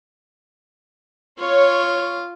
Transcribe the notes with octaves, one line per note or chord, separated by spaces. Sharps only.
F4 C#5